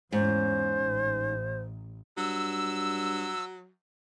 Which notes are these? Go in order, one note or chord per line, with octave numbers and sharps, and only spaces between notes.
E2 G#2 C#4 C5
A1
G2 F#3 E6